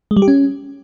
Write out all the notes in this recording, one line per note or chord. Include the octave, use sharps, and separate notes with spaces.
G#3
G3
G4
C#4